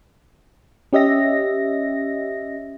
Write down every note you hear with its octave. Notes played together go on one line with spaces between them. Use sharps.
C#4 G4 D#5 E5 A#6